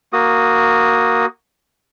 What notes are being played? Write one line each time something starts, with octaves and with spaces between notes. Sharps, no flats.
A#3 F#4 D#6